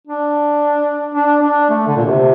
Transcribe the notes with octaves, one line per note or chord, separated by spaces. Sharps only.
D4
D4
D4
A3
D3
A#2
C3